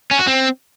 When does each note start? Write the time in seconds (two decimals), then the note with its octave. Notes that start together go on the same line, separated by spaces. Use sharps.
0.11 C#4
0.19 F#4
0.27 C4